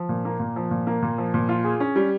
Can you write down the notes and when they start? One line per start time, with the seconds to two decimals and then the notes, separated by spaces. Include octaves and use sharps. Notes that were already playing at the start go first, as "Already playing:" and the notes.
Already playing: F3
0.09 A#2
0.25 A#3
0.40 A#2
0.56 F3
0.71 A#2
0.87 A#3
1.02 A#2
1.18 F3
1.34 A#2
1.49 F4
1.64 G#4
1.80 C#4
1.96 G3